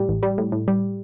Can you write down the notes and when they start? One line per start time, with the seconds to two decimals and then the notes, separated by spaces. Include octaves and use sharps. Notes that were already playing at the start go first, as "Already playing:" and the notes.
Already playing: A2 G3
0.08 A1
0.23 G3
0.38 A2
0.52 A2
0.68 G3